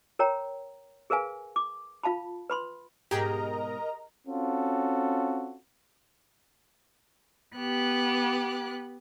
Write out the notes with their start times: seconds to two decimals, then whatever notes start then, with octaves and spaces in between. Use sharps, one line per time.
0.19 A#4 C#5 G5 A#5
1.10 G#4 A#4 B4 F5 G#5
1.56 D6
2.03 F4 F5 A5 B5
2.50 B4 B5 C6
3.11 G#2 B2 G4 G#4 A#4 D#5 G5 A#5
4.26 C4 C#4 F4 F#4 A4
7.57 B3 G4 F#6